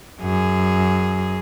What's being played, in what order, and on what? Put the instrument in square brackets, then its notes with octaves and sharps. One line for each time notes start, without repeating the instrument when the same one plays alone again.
[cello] F#2 G#4